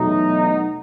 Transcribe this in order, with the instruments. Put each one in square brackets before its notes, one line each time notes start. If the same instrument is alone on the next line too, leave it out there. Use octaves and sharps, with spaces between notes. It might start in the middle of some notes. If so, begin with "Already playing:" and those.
Already playing: [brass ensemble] E2 B2 F#3 A3 D#4